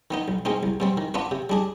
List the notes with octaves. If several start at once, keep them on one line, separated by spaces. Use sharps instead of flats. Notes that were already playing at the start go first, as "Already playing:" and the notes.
D#3 B3 D#4
B1
B2 G#3 C4 D#4
C2
B2 G3 C4
D#3
B3 D4 F4 B4
C3
G3 D4 G#4